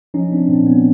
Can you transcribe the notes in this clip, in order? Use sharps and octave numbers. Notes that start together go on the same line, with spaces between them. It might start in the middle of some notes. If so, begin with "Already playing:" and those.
F3 C#4 D#4
C4 D4
A#2 C4 D4
B3 C#4